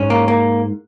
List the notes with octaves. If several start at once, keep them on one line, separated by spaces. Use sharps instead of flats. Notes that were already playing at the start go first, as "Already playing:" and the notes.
Already playing: G#2 C#4
A#3
A#3